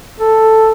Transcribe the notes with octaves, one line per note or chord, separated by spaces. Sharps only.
A4